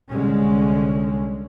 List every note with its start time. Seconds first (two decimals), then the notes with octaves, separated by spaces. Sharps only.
0.10 C2 D3 G#3 C#4